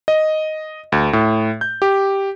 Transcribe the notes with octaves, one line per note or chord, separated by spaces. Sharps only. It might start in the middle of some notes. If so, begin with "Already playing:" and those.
D#5
D2
A2
G6
G4